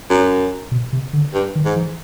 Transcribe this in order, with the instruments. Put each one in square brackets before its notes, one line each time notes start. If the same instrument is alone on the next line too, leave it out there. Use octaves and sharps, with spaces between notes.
[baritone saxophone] F#2
[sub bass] B2
C3
D3
[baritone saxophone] G2
[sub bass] D#3
[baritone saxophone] G#2
[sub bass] E3